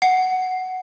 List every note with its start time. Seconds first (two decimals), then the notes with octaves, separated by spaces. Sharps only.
0.02 F#5 C7